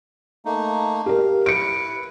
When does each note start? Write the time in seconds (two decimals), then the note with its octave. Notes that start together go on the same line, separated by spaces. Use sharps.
0.45 A3 A#3 D#4
1.06 G4 A#4 F5
1.46 E4 B4 C#7 D7